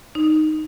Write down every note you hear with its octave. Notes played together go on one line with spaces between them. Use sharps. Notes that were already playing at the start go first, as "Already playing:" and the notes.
D#4